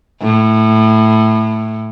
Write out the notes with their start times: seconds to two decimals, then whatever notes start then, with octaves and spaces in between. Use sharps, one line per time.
0.22 A2